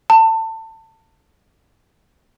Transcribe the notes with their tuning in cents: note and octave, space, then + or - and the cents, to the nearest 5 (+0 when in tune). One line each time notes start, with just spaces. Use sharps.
A5 +25